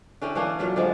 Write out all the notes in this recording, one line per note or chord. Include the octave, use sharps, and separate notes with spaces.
D3 C#4 E4 G5
E3 A#3 C#4 D4
A#2 F#3 A3
D3 F3 G#3